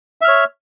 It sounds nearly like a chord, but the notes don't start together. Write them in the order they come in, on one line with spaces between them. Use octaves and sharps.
E5 F6 C#5